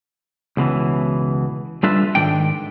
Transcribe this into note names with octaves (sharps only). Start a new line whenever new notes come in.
C#2 B2 D#3 E3
G3 D4 F4 A4 B4 E5
G#2 D#3 D4 G5